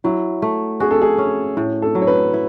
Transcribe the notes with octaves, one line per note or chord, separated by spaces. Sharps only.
F#3 E4
A3
F#4 G#4
A4
G#4
C#4
A2
A4
F#3
C#5
B4
E4